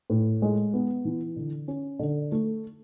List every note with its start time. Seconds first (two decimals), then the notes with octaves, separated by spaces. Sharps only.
0.10 A2
0.42 G#3
0.74 B3
1.05 E3
1.36 D3
1.68 C#4
1.99 D3
2.32 A3